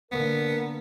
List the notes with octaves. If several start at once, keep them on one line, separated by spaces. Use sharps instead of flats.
D3 A#3 B3 A#4